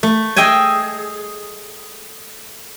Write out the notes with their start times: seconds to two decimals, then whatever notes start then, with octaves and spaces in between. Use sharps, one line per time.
0.03 A3
0.36 G#4 D#5 E5 G5 G#5